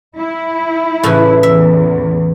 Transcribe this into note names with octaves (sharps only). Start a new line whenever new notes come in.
E4
A2 C#3 E3
E2 E5